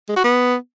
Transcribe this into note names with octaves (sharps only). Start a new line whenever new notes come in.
G#3
F#4
B3